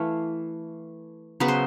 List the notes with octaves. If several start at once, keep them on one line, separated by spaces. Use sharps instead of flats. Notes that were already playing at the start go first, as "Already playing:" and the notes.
Already playing: E3 A3 F5
C#3 F#3 B3 B4
C5